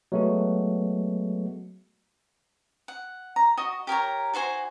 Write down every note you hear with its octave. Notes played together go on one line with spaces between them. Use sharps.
F#3 G#3 A3 B3 F#4
F#5
A#5
F#4 D#5 D#6
G4 A#4 C#5 A#5
D#4 F#4 C5 G#5